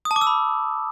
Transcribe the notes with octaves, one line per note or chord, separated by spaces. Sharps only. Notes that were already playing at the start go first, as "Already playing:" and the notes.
D#6
A5
D6
E6
B5